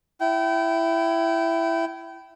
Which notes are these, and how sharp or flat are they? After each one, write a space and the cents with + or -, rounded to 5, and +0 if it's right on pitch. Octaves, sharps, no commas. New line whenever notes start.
E4 +10 G5 -30